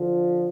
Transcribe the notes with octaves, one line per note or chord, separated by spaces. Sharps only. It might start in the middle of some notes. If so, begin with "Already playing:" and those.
Already playing: D3 F3